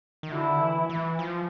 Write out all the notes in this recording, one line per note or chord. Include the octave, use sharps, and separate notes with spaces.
D#3
D3 E4
E3
E3
F3